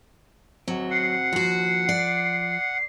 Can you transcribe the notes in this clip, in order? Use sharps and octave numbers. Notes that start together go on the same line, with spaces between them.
F#3 C4 F#4
F#5 C7
D#2 F3 F#4
D5